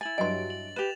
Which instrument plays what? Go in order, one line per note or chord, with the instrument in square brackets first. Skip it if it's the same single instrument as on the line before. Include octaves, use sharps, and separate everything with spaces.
[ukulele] E4 G#5 [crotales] A6 F#7
[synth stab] G2 F#3 D7 [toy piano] D#5 C6
[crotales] F#7
[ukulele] G4 B4 [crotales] E7 F7